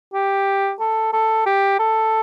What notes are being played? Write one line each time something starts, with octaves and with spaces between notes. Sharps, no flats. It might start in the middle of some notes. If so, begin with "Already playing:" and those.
G4
A4
A4
G4
A4